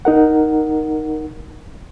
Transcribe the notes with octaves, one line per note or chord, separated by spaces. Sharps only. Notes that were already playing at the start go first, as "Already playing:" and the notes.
D#4 A#4 F#5